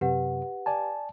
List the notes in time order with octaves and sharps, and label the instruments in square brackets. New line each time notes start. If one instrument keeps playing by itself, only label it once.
[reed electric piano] F#2 C3 [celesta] G4 B4 F#5
[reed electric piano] D5 G#5 A5